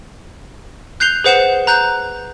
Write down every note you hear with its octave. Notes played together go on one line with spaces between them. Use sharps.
F#6 G6 C7 F7 G7
G#4 B4 C5 F#5 C7 E7
A#5 F#6 G6